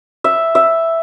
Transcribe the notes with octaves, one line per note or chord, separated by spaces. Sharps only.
E5
E5